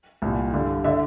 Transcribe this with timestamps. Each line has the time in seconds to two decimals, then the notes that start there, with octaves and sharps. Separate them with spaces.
0.22 C2 A#2
0.53 G2 D3
0.84 D3 E5